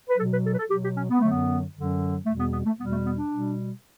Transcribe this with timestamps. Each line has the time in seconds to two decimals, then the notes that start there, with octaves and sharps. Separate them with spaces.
0.09 B4
0.18 F#3 A4
0.22 B2
0.32 B4
0.44 A4
0.53 B4
0.58 A4
0.70 B2 F#3 G4
0.84 G4
0.97 C#4
1.09 B3
1.19 F#2 D3 F#3 A3
1.30 B3
1.74 F#2 D3 F#3
2.26 E2 B2 G3 A3
2.39 B3
2.53 B3
2.65 A3
2.79 E2 B2 G3 B3
2.91 A3
3.05 B3
3.18 D4
3.31 B2 G3